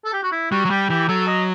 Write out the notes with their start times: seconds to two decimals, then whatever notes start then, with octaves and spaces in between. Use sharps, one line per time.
0.05 A4
0.13 G4
0.23 F#4
0.32 E4
0.51 G3 F#4
0.65 F#3
0.70 G3 G4
0.90 E3 G4
1.09 F#3 A4
1.27 D#5